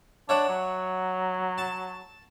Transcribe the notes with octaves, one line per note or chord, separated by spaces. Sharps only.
D4 C#5 E5 F#5
F#3
A5